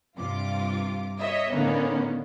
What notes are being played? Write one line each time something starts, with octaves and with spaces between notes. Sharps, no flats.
G2 C3 F4 D6
C#5 D#5 E5
A2 D3 D#3 A#3 B3 C#4